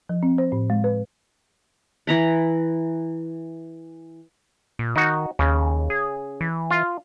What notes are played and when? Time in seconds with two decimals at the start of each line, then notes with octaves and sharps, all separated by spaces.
0.09 F3
0.23 C4
0.38 C5
0.52 A2
0.70 G#3
0.84 B4
2.07 E3 A#5 B5
4.79 A#2
4.96 D#3 D#4 F#4
5.39 D#2 C#3
5.90 G#4
6.41 E3
6.71 F4